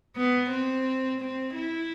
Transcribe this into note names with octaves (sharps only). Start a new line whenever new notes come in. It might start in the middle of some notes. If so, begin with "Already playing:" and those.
B3
C4
C4
E4